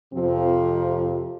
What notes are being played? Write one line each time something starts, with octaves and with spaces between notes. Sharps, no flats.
F2 C3 F3 C4